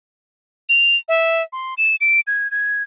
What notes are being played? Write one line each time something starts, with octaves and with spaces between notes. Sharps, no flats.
F7
E5
C6
E7
D7
G#6
G#6